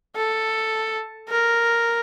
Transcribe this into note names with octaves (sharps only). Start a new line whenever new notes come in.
A4
A#4